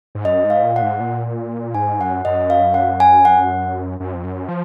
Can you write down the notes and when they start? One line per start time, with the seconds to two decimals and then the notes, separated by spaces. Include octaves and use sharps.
0.15 G#2
0.25 F#2 D#5
0.44 G#2
0.50 F5
0.63 A#2
0.76 F#5
0.82 G#2
1.00 A#2
1.75 G#2 G#5
1.99 F#2 F#5
2.25 F#2 D#5
2.50 F5
2.74 F#5
3.00 G#5
3.25 F#5
4.00 F#2
4.13 F2
4.24 F#2
4.49 F3